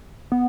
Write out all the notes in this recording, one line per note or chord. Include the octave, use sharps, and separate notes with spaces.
B3